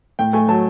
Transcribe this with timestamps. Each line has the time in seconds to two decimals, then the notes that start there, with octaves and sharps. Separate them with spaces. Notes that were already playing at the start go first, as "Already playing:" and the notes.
0.19 A2 G5
0.33 A3 G#5
0.48 F#3 A5